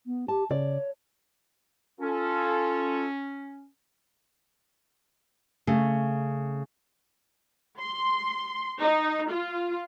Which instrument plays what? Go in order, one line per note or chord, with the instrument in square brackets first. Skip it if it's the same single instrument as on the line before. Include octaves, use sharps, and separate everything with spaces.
[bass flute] B3
[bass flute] G4 [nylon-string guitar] A5
[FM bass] C#3 [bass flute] C#5 [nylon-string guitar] D5
[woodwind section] C#4 [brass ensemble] F4 A4
[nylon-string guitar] C#3 A3
[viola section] C6
D#4
F4